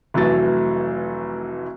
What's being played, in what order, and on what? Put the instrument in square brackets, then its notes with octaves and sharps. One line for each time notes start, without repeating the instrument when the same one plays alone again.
[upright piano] F1 E3 F#3 A3 A6